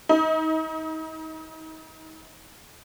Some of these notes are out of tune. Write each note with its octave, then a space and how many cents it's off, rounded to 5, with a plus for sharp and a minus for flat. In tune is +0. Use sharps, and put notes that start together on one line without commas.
D#4 +35